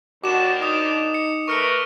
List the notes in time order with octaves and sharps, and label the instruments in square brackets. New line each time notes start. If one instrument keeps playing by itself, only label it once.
[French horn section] D#2 D#3 D4 [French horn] F#4 [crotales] D6 E7
[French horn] D#4 [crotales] D#6
[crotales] C#7
[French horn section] A3 A#4 B4 [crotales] C#6 F6 C#7